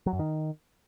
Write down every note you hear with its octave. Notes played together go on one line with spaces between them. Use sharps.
F#3
F#2
D#3